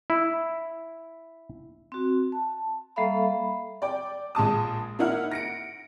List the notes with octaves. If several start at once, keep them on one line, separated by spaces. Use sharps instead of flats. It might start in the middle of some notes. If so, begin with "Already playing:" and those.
E4
C4 F#4
A5
G3 A#3 A4 E5 F5 B5
D5 G5
A#1 G#3 A5 D#6
A#3 D#4 E4 F#5 F6
A#6 C#7 D7